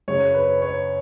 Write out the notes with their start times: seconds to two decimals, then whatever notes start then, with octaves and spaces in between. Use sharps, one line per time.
0.08 F#2 C#3 G#3 C#4 C#5
0.34 B4
0.62 C#5